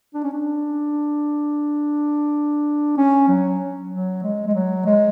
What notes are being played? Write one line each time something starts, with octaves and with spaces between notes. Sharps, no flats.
D4
C#4
D4
C#4
F#3
F#3
G#3
G#3
F#3
G#3